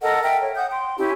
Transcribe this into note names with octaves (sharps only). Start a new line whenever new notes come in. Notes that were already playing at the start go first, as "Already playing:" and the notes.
A4 A#4 D#5 F#5
A#4 E5 G5
C#5
F#5 D#6 G6
G5 C6
C#4 E4 G4 G#5